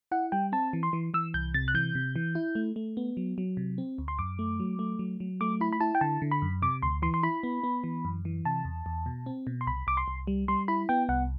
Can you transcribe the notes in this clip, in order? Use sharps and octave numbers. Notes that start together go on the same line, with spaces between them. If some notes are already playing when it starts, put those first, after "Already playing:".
E4 F#5
G3 G5
C4 A5
E3
C6
E3
E3 E6
C2 G6
C3 A6
F#6
E3 G6
C3
E3
E4
A3
A3
B3
F#3
F#3
C3
C4
D2
C6
F#2 D6
A3
F#3
A3
F#3
F#3
A3 D6
E4 B5
B5
E4 A5
G5
D3 A5
D3
B5
F#2
C3 D6
D2 C6
E3 C6
C6
E4 B5
B3
B3
E3
F#2
E3
C3 A5
E2
E2
B2
C4
B2
C6
C2 B5
C2 D6
C6
C2
G3
G3 C6
E4 B5
B3 G5
C2 F#5